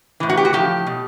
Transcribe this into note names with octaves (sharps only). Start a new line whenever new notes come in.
A2 E3
F#4
G4
F#4
A2 F3 G4
B2